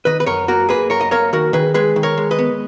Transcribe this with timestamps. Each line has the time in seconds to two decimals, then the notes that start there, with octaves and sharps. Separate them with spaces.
0.05 D#3 B4 D#5
0.20 B4
0.26 F#2 A#4 C#5
0.48 A#3 F#4 A#4
0.69 A#3 G#4 B4
0.90 F#2 A#4 C#5
1.01 D#5
1.11 A#3 A#4 C#5
1.33 D#3 F#4 A#4
1.53 D#3 G#4 B4
1.74 G#3 G#4 B4
1.96 D#3
2.03 A#4 C#5
2.18 G#3
2.31 B4 D#5
2.39 B3